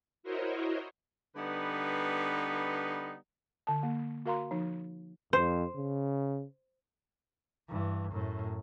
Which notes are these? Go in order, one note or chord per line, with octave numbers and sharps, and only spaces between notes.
E4 F#4 A#4 C5 C#5 D#5
D3 G3 B3 D#4 B4
D3 A5
A#3
F#4 A#4 F5 A#5 C6
F3 D#4
F2 C5
C#3
G2 E3
F#2 A2